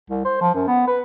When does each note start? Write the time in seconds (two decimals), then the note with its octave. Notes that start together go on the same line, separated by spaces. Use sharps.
0.10 C2
0.25 C5
0.41 F3
0.54 F#2
0.68 B3
0.88 B4